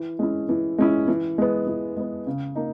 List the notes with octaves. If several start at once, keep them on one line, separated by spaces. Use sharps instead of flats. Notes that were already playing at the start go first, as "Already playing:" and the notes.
Already playing: E3
G#3 C#4 E4
E3
G#3 C#4 E4
E3
G#3 B3
E3
G#3 B3
C#3
A#3 D#4